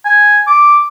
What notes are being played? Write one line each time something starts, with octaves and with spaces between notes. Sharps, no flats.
G#5
D6